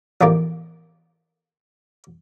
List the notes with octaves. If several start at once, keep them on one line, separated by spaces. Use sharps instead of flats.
A1 E2 F3 A#3 G4